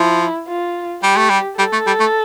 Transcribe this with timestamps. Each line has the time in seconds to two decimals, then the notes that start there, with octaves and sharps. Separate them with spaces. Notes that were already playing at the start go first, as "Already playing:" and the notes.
Already playing: F3 E4
0.48 F4
1.03 G3 G4
1.17 A3
1.30 G3
1.58 G3 A4
1.72 A3
1.87 G3
2.00 A3